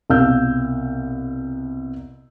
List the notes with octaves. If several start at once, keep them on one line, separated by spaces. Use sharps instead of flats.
C2 B2 F5 E6 F6 G6